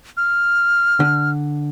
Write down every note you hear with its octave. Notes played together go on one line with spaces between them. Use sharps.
F6
D3